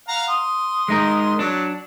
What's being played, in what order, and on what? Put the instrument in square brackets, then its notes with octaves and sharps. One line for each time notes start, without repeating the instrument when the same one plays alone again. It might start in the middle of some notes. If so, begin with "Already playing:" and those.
[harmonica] F5 F#5 A#5
C6 D#6
[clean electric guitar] G#3 D#4 A#4
[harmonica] F#3 [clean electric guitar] D4